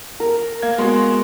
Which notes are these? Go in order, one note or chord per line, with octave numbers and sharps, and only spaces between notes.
A#4
A#3 F5 G#6
G#3 B3 F#4 C6